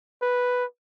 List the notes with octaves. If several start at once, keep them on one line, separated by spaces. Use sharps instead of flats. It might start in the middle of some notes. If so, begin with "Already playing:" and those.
B4